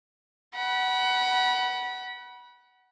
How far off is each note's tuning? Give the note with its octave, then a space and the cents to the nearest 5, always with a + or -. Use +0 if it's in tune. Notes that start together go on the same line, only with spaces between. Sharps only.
F#5 +20 B5 -30